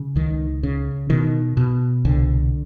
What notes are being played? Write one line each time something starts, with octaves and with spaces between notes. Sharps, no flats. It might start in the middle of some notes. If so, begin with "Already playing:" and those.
Already playing: C#3
C#2 D#3
C#3
B2 D#3
B2
C2 D3